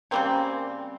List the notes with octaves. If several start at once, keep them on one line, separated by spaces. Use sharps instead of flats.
C#3 G3 A#3 C4